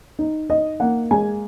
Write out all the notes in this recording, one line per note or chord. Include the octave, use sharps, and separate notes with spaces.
D#4
D#4 D#5
A#3 F#5
G#3 G#5